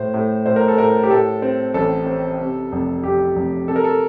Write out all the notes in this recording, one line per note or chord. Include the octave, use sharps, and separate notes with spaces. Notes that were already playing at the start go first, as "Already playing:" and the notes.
Already playing: A2 C5
A2
A2 C5
A#4
A4
A2 A#4
G4
A2 A4
C4
A1 A4
C4
C3
F1
F1 G4
F1
C3 A4
A#4
A4